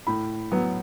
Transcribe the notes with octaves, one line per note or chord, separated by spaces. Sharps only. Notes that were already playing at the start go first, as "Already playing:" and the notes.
A2 B5
F#3 B3